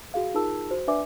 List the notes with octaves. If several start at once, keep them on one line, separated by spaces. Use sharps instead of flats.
F#4 G#4 F5
D#4 F4 G#4 A#4 A5 E6
F#4 C5
D4 B4 D5 E5 G#5 D6